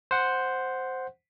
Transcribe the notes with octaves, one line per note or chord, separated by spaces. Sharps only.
C5 F#5